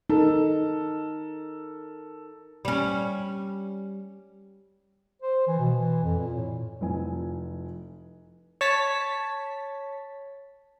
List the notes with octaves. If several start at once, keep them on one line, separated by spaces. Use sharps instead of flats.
D#4 A4 A#4
G3 C#4
C5
E3
B2
E3
F2
A#2
A2
F1 F3 C4 E4 G#5
C#5 A5 B6